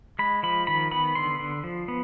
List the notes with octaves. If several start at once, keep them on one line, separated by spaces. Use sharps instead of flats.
G#3 B5
F3 B5
D#3 B5
B3 B5
D3 C6
D3
F3
B3